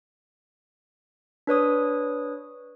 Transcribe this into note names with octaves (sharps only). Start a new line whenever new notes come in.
D4 B4 C#5 D#6